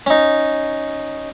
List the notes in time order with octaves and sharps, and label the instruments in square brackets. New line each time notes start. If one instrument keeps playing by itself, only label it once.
[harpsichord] C#4 D#4